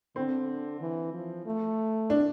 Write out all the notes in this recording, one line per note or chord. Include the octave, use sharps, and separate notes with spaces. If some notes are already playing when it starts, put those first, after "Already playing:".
D3 C4
E3
F3
A3
D4